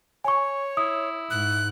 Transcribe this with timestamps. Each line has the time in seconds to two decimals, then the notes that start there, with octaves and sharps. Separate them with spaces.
0.24 C#5 G#5 C#6
0.77 E4 D#6
1.30 G#2 F#6